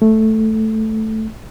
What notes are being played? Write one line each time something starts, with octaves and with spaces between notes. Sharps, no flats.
A3